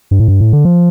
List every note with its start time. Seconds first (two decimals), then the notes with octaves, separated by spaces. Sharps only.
0.11 G2
0.20 A2
0.28 G2
0.41 A2
0.53 D3
0.65 F3